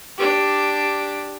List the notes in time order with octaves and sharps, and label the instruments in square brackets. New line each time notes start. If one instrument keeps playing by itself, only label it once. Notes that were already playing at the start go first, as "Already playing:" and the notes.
[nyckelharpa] D4 G4